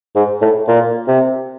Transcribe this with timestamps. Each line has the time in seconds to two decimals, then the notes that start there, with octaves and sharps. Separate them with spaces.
0.15 G#2
0.42 A2
0.68 A#2
1.07 C3